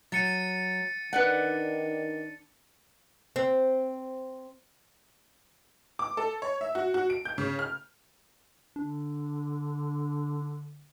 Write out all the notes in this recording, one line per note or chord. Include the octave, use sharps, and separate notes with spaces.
F#3 A6 C#7 D#7
D#3 D4 B4 D5 F#5
C4
D6
A4
C#5
E5
F#4
F#4
D7
G6
C#3
F6
D3 D4